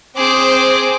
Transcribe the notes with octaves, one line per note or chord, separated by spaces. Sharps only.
C4 G#4 C5 D6